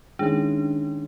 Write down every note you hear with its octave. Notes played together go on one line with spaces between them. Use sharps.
D#3 G#3 C#4 D4 E4